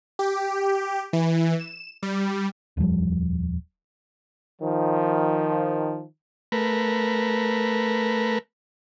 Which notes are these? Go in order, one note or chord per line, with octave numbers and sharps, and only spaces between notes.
G4
E3
E7
G3
D#1 F2 F3 G3
D#3 F3
A3 A#4 B4